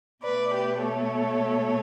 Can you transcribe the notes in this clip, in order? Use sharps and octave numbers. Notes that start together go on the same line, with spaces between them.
B2 A3 B4 D5
G4 B4
A4 C#5